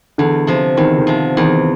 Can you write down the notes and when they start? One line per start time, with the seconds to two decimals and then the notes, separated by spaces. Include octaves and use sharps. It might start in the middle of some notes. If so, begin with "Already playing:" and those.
0.18 E2 D3
0.47 C3 F3
0.77 E2 D#3
0.98 D#3
1.07 C3 F3
1.37 E2 D#3